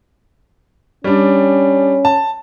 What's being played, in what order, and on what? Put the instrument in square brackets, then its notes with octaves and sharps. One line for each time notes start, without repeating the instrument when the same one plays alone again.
[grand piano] G3 D4 [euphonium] C#4
[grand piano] A5